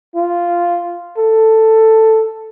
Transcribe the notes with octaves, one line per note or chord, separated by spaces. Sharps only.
F4
A4